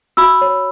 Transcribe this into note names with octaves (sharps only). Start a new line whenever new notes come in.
F#4 B5 E6
C#5